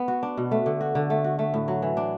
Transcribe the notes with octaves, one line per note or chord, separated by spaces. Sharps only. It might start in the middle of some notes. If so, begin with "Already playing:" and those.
Already playing: B3
F#4
D4
B2
A3
D3
F#4
D3
A3
F#4
A3
A2
F#3
E3
D4